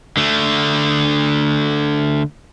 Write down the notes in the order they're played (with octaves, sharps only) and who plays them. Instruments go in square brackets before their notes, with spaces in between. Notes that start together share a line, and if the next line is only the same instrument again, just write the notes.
[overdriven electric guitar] D3 A3